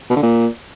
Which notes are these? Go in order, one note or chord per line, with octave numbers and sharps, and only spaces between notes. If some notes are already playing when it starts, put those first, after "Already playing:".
B2
D3
A#2